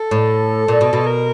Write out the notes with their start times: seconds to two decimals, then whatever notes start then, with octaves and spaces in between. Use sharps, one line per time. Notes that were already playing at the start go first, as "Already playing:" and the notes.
Already playing: A4
0.11 A2
0.68 A#2
0.81 B2
0.93 B2
1.06 A#4